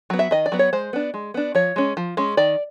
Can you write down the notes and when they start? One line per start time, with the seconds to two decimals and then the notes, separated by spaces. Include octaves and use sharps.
0.10 F#3 B3
0.19 E5
0.31 D#3 D#5
0.46 D5
0.52 F#3 B3
0.59 C#5
0.73 G#3 C5
0.93 B3 D4
1.14 G#3
1.34 B3 D4
1.55 F3 C#5
1.76 G#3 C#4
1.97 F3
2.17 G#3 C#4
2.37 D#3 D5